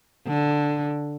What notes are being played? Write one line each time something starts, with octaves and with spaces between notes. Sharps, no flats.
D3